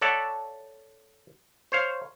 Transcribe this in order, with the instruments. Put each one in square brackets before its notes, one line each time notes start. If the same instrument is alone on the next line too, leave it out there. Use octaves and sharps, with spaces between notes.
[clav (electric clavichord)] A4 C#5 D5 E5 F#5 A5
C5 C#5 F5